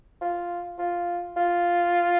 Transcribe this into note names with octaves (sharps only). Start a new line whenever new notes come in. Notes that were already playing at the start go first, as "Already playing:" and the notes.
F4
F4
F4